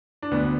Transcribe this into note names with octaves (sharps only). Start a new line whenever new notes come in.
D4
D2 B3